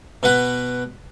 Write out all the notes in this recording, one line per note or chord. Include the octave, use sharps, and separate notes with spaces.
B2 B4 F#5